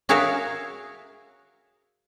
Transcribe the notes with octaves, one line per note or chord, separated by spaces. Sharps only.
F#4 G#4 A#4 C#5 E5 F5